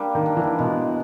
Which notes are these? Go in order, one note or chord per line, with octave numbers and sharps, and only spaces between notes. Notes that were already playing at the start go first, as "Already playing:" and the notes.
Already playing: G3 A#3 D4
D#3
D4
E3
B2 G#3